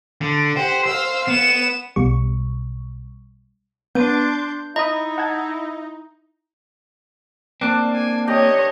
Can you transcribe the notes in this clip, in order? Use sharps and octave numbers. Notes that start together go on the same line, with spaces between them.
D3
G4 C5 F#5
C5 F5 E6
B3 E7
B1 B2 G3 C#6
B3 D4 C6 G6 D#7
D#4 E4 D#5 A#5 B5 D#6
F#5 A5 G#6
A#3 C4 D4 D6
G#5
G4 C#5 D#5 A#5